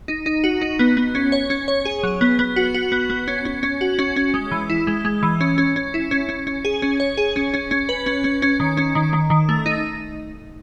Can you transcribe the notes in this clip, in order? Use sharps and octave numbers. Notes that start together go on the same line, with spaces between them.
D#4
D#4
F#4
D#4
B3
B3
C#4
C#5
C#4
C#5
G#4
F#3
B3
B3
F#4
F#4
B3
B3
C#4
C#4
C#4
F#4
C#4
C#4
G#3
E3
E4
G#3
G#3
E3
C#4
C#4
C#4
E4
C#4
C#4
C#4
G#4
C#4
C#5
G#4
C#4
C#4
C#4
B4
C#4
C#4
C#4
D#3
C#4
D#3
D#3
D#3
A3
D#4